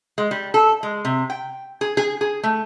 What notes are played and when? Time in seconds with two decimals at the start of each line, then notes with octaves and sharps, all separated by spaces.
0.18 G#3
0.31 G3
0.54 A4
0.83 G#3
1.05 C3
1.30 G5
1.81 G#4
1.97 G#4
2.21 G#4
2.43 A3